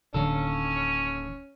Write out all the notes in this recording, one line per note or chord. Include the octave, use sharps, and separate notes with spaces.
D1 D3 D#3 A#3 C#4 A4